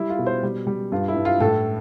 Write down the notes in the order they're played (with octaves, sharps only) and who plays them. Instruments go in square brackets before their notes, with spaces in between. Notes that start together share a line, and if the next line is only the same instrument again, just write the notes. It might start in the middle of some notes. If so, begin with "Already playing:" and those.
Already playing: [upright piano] G3 E4
F4
B2
C5
G3
G3
G2 F4
E4
G2
F4
A2 A4